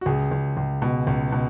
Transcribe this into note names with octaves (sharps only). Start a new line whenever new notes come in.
F#4
C#2 G#4
C#2
C#2
B2
C#2
B2